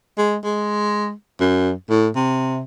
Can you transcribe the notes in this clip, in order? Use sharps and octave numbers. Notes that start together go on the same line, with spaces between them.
G#3
G#3
F#2
A2
C3